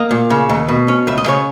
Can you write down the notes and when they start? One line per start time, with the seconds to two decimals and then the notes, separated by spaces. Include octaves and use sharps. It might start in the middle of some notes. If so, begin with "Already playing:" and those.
Already playing: A#3 D#5
0.11 A#2
0.30 C#3
0.49 D#2
0.68 B2
0.88 C#4
1.07 C#2 E5
1.18 D#5
1.26 C#3 C#5